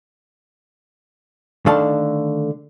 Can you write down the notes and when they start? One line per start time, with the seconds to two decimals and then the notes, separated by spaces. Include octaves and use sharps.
1.66 D3 D#3 A3 F5 A5